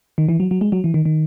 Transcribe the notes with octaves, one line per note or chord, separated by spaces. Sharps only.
D#3
E3
F#3
F#3
G#3
F#3
E3
D#3
D#3